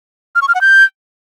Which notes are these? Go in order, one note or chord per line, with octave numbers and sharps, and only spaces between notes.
F6
C#6
F6
F#5
G6